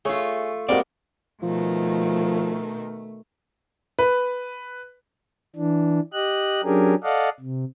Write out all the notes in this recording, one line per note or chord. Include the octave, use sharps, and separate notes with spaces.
A3 F4 G#4 C#5
G3 G#3 A#3 C4 D#4 F#4 D5
B2 D#3 F3 A3
B4
E3 D4
G4 D#5 F#6
F#3 C#4 D4 G4 G#4 A#4
A4 D5 D#5 F5 F#5
C3